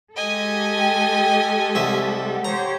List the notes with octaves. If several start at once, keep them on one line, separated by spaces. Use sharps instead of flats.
G#3 G4 A4 D#5 G#5
G5
C2 E5 F#5
G4 C5 C#5 A#5